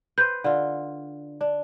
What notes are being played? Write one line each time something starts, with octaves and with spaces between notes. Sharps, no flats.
B4 C5 G6
D3 F4
D4